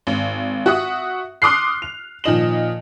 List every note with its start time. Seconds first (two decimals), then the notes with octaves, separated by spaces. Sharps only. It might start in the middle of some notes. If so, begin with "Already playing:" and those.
0.07 G#1
0.66 F#4 E5 F#5 D#6
1.42 C6 D6 D#6 F6 F#6 C7
1.82 F7
2.24 A#2 D#3 F3 D#5 E7 F#7